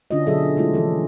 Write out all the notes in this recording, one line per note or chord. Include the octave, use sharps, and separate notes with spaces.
D3 C#4 D4 F4 F#4 D#5
B2 D3 F#3 G#4 A4 E5
G#3 A3 E4 F4 G4
E3 F3 C#4 A4